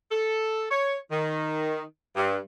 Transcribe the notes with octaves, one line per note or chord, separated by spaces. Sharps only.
A4
C#5
D#3
G2